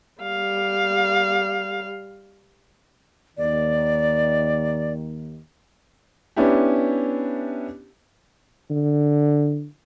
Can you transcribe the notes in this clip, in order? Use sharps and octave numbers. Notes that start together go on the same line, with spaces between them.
G3 F5
D#2 D#3 D5
B3 C#4 D4 E4 G4
D3